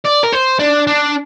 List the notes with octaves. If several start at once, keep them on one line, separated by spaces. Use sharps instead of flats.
D5
A#4
C5
D4
D4